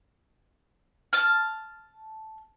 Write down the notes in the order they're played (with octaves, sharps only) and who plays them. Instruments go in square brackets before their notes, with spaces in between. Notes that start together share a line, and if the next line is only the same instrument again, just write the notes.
[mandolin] A5 F6